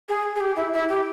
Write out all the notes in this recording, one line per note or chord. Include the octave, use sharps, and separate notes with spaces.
G#4
G#4
G4
E4
E4
G4